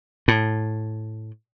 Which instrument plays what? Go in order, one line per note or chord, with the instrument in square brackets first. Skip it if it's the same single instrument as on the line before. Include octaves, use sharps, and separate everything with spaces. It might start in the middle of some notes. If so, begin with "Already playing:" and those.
[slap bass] A2